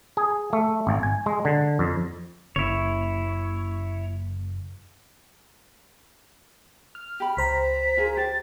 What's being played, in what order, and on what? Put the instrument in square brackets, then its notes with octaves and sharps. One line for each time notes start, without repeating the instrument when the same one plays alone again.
[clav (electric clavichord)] G#4
A3
G#1
G#5
G#3
D3
F2
[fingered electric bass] F#1 [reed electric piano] C#3 A#3 [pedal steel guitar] E4 C#5
[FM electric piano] F6
[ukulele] G4 B5
[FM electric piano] C#2 C5 A#5 [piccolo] B6
[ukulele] F4 G#4 A#4
[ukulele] G4 C5 [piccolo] A6